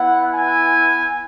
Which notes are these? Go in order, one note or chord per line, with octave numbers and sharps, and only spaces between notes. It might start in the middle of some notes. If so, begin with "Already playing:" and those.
Already playing: B3 E4 F#5
G#5